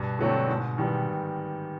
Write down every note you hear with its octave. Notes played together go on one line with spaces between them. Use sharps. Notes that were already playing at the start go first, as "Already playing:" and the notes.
Already playing: G2 B2
D3 F#3 A3 C4
G#2
D#3 G3 B3